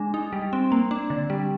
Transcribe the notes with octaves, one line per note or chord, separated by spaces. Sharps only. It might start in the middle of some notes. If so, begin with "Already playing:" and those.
Already playing: G#3 D4
D#4
G3
C4
A#3
D4
D3
G3